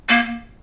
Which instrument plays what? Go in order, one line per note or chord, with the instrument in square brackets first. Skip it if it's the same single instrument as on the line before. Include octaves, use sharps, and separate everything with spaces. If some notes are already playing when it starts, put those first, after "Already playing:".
[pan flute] A#3